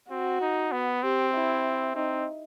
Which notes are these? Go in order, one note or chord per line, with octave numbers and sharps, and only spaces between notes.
C4 F#4
D#4
B3
C4 G4
E4
C4 D#4